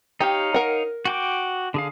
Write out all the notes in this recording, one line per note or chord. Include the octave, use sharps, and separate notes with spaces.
D#4 G4 C#5 F5
A#4 F#5
F#4 G5 D6
D3 G#4 F5